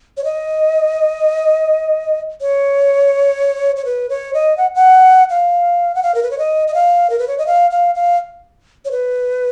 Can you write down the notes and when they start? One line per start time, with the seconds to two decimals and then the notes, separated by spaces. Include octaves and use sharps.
0.17 C#5
0.24 D#5
2.41 C#5
3.77 C#5
3.85 B4
4.10 C#5
4.34 D#5
4.58 F#5
4.75 F#5
5.30 F5
5.95 F#5
6.03 F5
6.15 A#4
6.23 B4
6.31 C#5
6.39 D#5
6.68 D#5
6.74 F5
7.10 A#4
7.19 B4
7.28 C#5
7.38 D#5
7.47 F5
7.71 F5
7.95 F5
8.85 C#5
8.91 B4